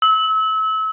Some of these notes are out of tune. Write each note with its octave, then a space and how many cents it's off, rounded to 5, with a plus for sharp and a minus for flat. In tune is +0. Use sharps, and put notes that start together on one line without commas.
E6 -30